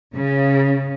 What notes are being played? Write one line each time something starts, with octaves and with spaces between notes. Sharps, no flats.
C#3